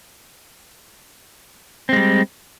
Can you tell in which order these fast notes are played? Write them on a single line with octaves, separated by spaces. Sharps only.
C4 G#3 G3